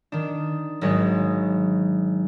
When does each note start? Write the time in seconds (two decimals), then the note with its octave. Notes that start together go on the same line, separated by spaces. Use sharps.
0.12 D#3 D4
0.81 G#1 F#3 G#3 A6